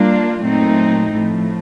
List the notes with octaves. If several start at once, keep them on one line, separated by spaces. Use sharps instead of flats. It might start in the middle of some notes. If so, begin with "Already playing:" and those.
Already playing: G3 A#3 D4 F4
A#2 F#3 A3 C4 D#4
A2 F3 A3